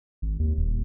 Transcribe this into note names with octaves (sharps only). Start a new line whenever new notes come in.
G#1
D#2
D#1